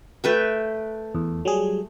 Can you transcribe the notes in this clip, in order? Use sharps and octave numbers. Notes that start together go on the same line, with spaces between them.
A3 B4 G5
E2
F#3 G3 G#4